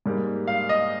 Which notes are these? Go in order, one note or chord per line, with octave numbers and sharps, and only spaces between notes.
G#2 G3 A#3
F5
D#5